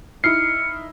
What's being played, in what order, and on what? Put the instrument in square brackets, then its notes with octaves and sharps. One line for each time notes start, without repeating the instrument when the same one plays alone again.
[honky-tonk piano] D#4 E4 [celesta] F6 [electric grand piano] C7 [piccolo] C#7